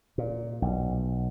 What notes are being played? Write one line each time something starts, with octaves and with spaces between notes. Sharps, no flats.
A#2
B1